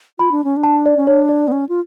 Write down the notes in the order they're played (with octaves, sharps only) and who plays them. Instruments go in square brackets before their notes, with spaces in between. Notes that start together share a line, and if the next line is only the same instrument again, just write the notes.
[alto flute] F4 [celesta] B5
[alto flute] D4
C#4
D4
[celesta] A5
D5
[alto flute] C#4
[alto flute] D4 [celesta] C#5
[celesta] D5
[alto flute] B3
C#4
F4